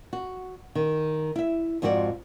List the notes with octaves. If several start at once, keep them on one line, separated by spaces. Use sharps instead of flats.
F#4
D#3
E4 E5
F2 G#2 F3 F#4 G#4 D5